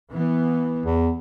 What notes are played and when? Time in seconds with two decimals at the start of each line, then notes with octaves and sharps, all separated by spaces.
0.12 E3 B3
0.85 E2